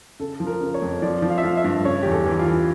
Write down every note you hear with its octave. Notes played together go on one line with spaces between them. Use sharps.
C#3 A4
F3
A#4
C#3
C#5
F2
F3 D5
F3
F5
E5
F3 F5
E5
G2
C#3 C#5
E2 G4
A4
E3
F4
E3